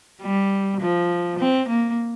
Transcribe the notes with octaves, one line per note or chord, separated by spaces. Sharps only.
G3
F3
C4
A#3